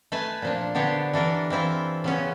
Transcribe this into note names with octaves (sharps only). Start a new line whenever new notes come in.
A3 B4 G#5 A5
A#2 F3 D4
D3 B3 D4 G4 C#5
E3 D4 A4 A#4
E3 C4 E4 F4
C#3 B3 C#4